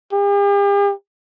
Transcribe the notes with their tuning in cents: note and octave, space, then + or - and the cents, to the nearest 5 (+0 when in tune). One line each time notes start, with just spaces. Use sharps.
G4 +45